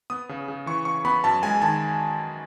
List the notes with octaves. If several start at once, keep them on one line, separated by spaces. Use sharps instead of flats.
B3 D#6
C#3
C#3
E3 C#6
C#3 C#6
B3 B5
F#2 A5
G#3 G#5
D#3 A5